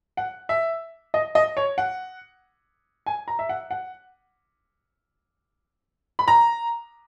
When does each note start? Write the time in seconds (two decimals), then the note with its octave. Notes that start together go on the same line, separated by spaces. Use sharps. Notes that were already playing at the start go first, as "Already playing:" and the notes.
0.17 F#5
0.49 E5
1.14 D#5
1.35 D#5
1.57 C#5
1.78 F#5
3.06 G#5
3.28 A#5
3.39 E5
3.49 F#5
3.71 F#5
6.19 B5
6.28 A#5